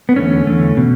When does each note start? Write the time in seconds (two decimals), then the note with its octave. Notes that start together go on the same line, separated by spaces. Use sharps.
0.09 B3
0.16 E2 D3 A3 C#4
0.47 E2 D3 A3
0.77 B2